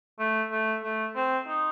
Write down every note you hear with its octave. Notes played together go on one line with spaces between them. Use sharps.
A3
A3
A3
C4
D#4